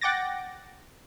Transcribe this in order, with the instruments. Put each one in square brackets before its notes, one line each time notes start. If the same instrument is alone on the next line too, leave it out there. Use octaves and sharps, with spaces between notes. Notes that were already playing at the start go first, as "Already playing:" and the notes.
[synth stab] F#5 G5 D6 A6 A#6